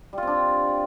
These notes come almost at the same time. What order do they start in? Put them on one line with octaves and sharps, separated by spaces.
G3 F4 C4 D4